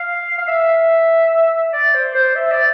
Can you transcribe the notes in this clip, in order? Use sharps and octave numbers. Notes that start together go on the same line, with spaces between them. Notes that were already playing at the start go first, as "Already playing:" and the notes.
Already playing: F5
F5
E5
D5
C5
C5
E5
D5